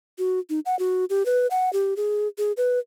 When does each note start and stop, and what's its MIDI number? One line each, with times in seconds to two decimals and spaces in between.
0.18 0.39 66
0.50 0.60 63
0.66 0.78 78
0.79 1.05 66
1.10 1.26 67
1.26 1.47 71
1.51 1.72 78
1.73 1.94 67
1.97 2.28 68
2.38 2.52 68
2.57 2.79 71